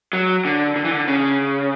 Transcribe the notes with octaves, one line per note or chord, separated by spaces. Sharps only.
F#3
D3
D3
E3
D3
C#3